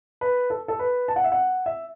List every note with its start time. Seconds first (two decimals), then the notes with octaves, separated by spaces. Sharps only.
0.21 B4
0.50 A4
0.68 A4
0.79 B4
1.08 A5
1.16 F#5
1.24 E5
1.32 F#5
1.66 E5